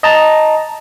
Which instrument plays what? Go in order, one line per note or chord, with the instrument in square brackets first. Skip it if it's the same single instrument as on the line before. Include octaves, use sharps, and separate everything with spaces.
[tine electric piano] D#5 A5 A#5